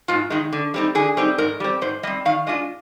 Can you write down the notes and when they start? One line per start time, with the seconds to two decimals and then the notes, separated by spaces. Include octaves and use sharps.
0.08 G#2 F4
0.30 D#3 G#3 D#4
0.53 D3
0.74 G3 C4 D#4
0.95 D3 G#4
1.17 G3 C4 D#4
1.38 G#2 A#4
1.60 G3 C4
1.81 G#2 C5
2.03 G3 D#5
2.07 C4
2.25 D#3 F5
2.47 G#3 D4 F4 D#5